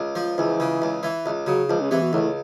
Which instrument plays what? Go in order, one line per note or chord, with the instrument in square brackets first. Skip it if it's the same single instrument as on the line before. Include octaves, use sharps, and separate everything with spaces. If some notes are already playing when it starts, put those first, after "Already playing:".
Already playing: [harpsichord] C#2
F3
[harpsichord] C#2 [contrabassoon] E3
[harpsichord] C#3
C#2
E3
C#2
[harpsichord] C#3 [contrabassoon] F#3
[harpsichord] C#2 [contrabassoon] F3
[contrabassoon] C#3
[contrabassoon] C3 [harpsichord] E3
[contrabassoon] B2
[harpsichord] C#2 [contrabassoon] A2